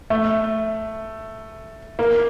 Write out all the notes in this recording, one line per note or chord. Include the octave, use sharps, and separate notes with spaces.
A3
A#3